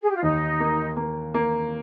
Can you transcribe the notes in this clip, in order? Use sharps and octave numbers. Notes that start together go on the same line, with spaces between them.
G#4
G4
F4
D#2 D#4
A#3
A#3
A#3